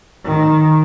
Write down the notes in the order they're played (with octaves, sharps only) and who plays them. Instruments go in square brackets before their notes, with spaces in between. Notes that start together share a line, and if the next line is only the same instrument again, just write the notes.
[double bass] D#3